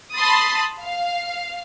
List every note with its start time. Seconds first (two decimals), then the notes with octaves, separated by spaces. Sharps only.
0.16 A5 B5 C6 D#6 A6
0.81 F5